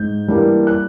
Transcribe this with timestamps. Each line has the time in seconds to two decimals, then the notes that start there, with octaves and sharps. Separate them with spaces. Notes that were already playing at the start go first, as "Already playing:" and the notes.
Already playing: G#2 G6
0.27 E3 G3 A#3 D4
0.67 F#6